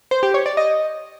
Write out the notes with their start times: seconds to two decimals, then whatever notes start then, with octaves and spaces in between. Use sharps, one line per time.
0.11 C5
0.23 G4
0.34 C#5
0.46 D5
0.57 D#5